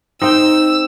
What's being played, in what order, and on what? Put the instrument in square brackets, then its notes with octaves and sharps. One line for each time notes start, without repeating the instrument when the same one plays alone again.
[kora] C4 G5 [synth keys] D#4 [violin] E6